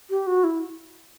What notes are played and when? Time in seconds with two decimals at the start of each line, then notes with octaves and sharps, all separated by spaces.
0.10 G4
0.27 F#4
0.44 E4